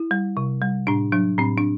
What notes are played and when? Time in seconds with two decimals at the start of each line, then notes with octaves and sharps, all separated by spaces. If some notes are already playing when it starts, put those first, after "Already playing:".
Already playing: E4
0.11 G3
0.37 C3
0.62 G3
0.87 A2 D4
1.12 F#3 D4
1.38 A2 C4
1.58 D4